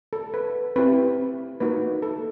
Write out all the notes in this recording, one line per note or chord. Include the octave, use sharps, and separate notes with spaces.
A4
B4
C4 E4 G4 B4
A#3 D#4 F#4 B4
A4